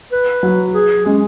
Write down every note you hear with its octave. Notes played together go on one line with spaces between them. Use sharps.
B4
F#3
G#4
G#3 C#4